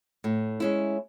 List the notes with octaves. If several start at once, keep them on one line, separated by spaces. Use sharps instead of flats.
A2
G#3 C#4 E4